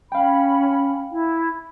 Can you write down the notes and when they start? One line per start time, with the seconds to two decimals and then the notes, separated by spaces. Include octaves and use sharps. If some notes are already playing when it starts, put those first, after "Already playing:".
0.12 C#4 F5 G5 B5
1.11 E4